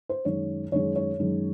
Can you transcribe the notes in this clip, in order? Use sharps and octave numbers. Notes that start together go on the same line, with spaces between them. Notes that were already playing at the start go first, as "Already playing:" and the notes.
C5
F#2 D#3 G#3 C#5
F#2 D#3 G#3 C#5
C#5
F#2 D#3 G#3